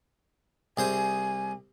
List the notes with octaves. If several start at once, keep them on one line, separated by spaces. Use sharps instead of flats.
C2 G#4 C5 G#5